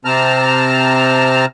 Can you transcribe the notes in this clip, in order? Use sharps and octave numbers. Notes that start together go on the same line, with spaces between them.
C3 C4 A5 A#5 F6